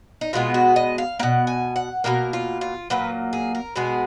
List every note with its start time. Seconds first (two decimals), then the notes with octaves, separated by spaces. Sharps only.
0.21 D#4
0.33 B2 G#3 B3 F4
0.54 F#4
0.76 D#5
0.98 F5
1.19 B2 A#3 F#5
1.47 G#5
1.76 F#5
2.04 B2 F#3 A#3 A#4
2.33 F4
2.61 F4
2.90 A#2 F#3 A#3 B4
3.33 G#4
3.55 A#4
3.76 B2 G#3 B3 G#4